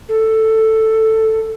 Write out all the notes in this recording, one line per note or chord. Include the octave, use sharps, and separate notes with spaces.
A4